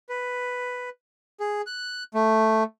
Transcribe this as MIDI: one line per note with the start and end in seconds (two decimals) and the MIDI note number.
0.09 0.89 71
1.40 1.62 68
1.66 2.04 90
2.14 2.64 57